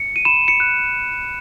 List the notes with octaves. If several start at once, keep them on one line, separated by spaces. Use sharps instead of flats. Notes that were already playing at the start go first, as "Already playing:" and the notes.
Already playing: C#7
D#7
B5 E7
C#7
F#6